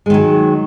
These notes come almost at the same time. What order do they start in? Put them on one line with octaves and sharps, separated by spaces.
G#3 D#3 F#3